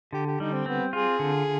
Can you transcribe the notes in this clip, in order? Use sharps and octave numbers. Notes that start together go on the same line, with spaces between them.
D3 G4
G4
G3 D#4
C4
B3 C4
F4 G#4
D3